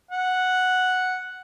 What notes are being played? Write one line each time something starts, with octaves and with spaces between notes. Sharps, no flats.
F#5